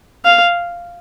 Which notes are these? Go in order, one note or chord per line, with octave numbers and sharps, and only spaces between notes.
F5